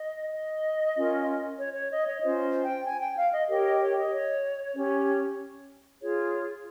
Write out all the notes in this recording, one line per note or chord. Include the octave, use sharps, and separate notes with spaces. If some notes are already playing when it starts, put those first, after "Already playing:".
Already playing: D#5
D#5
C#4 F4 A#4
C#5
C#5
D#5
C#5
C#4 F4 C5 D#5
G5
G#5
G5
F5
D#5
G4 A#4 C#5 D#5
D#5
C#5
D#5
C#5
C#4 G4 C#5
F4 G#4 C#5